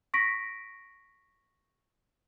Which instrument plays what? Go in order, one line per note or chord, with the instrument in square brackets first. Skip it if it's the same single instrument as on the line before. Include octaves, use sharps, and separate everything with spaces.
[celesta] C#6 A#6 B6 D7